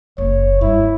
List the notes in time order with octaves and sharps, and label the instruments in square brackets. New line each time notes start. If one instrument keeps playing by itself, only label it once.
[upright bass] F#1 [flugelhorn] C#5
[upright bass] G2 [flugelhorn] E4